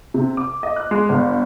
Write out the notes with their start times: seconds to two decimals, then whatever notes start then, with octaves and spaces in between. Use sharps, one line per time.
0.14 C3
0.37 D6
0.63 D#5
0.76 F#6
0.91 G#3
1.09 G1